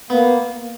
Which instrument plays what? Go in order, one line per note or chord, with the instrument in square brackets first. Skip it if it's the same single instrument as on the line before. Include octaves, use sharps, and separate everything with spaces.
[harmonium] A#3 [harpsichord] B3